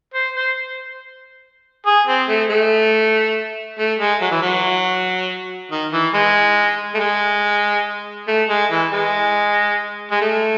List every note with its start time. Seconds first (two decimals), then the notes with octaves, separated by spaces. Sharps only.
0.14 C5
0.36 C5
1.86 G#4
2.07 C4
2.28 A3
2.50 A3
3.79 A3
3.99 G#3
4.21 F#3
4.31 E3
4.42 F#3
5.71 D#3
5.93 E3
6.14 G#3
6.94 A3
6.99 G#3
8.28 A3
8.50 G#3
8.71 E3
8.93 G#3
10.11 G#3
10.21 A3